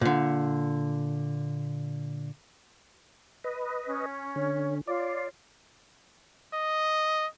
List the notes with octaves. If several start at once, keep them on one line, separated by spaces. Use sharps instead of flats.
A#2 D3
B4 D#5
C#4
D3 C#5
F4 C#5 D5
D#5